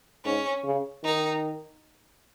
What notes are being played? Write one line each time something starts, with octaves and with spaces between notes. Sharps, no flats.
G#2 C#4
C#3
D#3 D#4